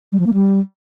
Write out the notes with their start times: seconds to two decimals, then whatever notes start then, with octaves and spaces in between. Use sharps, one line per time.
0.12 G3
0.19 F3
0.26 A#3
0.34 G3